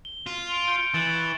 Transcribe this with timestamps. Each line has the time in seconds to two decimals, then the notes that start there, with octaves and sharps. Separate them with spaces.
0.05 G7
0.27 F4
0.53 D7
0.68 G6 C#7
0.94 E3 A6 F#7
1.09 C#6